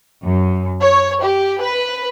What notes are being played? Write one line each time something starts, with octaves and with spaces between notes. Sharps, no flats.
F#2
C#5
G4
B4